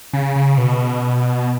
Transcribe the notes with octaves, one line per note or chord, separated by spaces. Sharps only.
C#3
C#3
B2